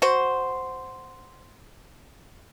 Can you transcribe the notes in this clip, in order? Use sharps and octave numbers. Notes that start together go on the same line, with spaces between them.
F#4 C5